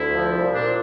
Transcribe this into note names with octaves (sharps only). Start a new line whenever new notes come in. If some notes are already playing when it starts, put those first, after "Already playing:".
Already playing: D2 E4
F3
C2
A#2 D4